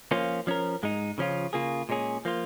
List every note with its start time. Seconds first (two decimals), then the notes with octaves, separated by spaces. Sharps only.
0.11 F3 A#3 C#4 F4
0.47 F3 C#4 A#4
0.83 G#2 G#3 D#4
1.18 C#3 F3 C#4 F4
1.53 C#3 A#3 F4 G#4
1.89 A#2 G#3 C#4 G#4
2.25 F3 A#3 F4